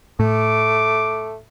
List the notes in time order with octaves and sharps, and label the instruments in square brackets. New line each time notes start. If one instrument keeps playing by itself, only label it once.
[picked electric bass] A2 [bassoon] A3 [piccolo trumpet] D6